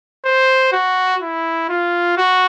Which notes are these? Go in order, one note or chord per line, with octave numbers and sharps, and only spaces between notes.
C5
F#4
E4
F4
F#4